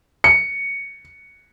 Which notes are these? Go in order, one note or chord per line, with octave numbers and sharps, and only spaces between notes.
C#7